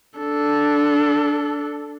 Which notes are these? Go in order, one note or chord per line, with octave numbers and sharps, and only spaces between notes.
D4 A4